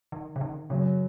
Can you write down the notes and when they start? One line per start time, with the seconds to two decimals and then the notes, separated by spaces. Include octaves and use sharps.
0.12 D#3
0.36 C#3
0.41 D#3
0.70 F#2 C#3 F#3